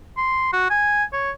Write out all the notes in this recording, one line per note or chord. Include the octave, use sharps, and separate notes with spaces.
C6
F#4
G#5
C#5